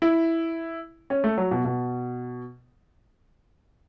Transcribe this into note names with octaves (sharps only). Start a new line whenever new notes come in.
E4
C#4
A3
F#3
B2
B2